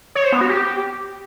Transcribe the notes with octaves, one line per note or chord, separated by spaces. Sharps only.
C#5
C5
B3
F#4
G4